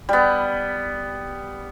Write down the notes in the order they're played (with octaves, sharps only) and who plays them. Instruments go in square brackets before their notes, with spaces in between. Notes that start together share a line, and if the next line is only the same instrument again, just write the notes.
[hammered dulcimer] G3 B3